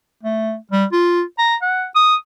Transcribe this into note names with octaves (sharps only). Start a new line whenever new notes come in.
A3
G3
F4
A#5
F#5
D#6